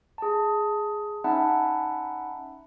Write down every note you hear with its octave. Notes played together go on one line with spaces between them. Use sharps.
G#4 A5
C#4 D#4 E5 F#5 A5 B5